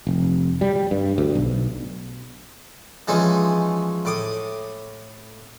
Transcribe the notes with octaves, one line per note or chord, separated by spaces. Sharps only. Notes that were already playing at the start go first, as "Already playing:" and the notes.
F1
G3
G3
G2
D2
B1
E3 F3 G#3 C#4 D#4
A2 D6 D#6